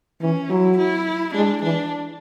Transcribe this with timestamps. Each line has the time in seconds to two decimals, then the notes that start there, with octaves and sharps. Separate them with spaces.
0.22 E3 C#4
0.50 F#3 E4
0.78 E4
1.35 G#3 D4
1.63 E3 D4